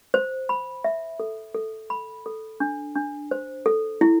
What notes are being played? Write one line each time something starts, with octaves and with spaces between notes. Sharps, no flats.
C5
B5
E5
A4
A4
B5
A4
D4
D4
C5
A4
E4